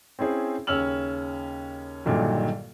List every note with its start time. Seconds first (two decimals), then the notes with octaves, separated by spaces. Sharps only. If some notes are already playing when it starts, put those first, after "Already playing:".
0.19 C4 C#4 E4 G#4 C5
0.67 D#2 C#3 C#4 E6 F6 F#7
2.05 A#1 G2 A#2 D3 D#3 F#3